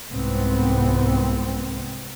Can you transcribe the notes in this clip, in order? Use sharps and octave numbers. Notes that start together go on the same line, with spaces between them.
C2 G#2 B3 C4